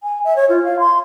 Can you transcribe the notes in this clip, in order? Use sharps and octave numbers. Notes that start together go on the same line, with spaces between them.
G#5
E5
C#5
F4
F5
C6